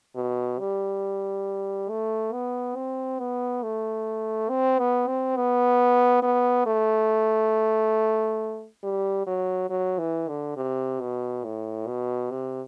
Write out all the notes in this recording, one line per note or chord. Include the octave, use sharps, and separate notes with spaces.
B2
G3
A3
B3
C4
B3
A3
C4
B3
C4
B3
B3
A3
G3
F#3
F#3
E3
D3
C3
B2
A2
B2
C3